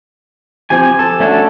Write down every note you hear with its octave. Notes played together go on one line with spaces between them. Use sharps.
F3 C4 G4 G#5
A4
A3 C#4 D4 F#4 A4